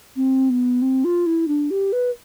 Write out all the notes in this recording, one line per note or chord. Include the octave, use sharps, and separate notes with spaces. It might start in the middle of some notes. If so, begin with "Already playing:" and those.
C4
B3
C4
F4
E4
D4
G4
B4